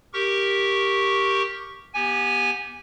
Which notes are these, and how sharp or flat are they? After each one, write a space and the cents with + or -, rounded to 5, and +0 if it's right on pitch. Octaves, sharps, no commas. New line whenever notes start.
G4 +0 A#4 +0 C#6 +0
B3 -25 G4 +0 G#5 -10